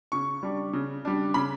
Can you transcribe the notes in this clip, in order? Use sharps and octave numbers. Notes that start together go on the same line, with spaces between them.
C#3 C#6
G3 D4
C#3
G3 D4
C#3 B5